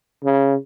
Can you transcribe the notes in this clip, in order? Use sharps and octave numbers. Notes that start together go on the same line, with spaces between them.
C#3